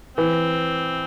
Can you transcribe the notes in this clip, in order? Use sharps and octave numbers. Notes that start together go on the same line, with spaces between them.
E3 C4